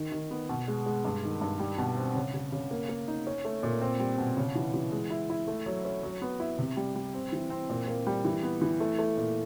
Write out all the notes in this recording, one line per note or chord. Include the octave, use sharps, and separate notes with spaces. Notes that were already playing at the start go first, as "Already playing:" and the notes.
Already playing: D#3
D#3
B3
B2
G#3
G#3
G2
D#3
G2
G3
B2
C4
C#3
C#3
C#3
A#3
A#3
D#4
C#4
A3
A#2
C4
G3
B2
C#3
E3
E3
G#3
E4
E4
A3
F#3
C#4
F#3
B3
E4
C3
G3
G3
C4
E3
C4
A#2
A#3
G3
E3
B3
E3
A3
A3
A#2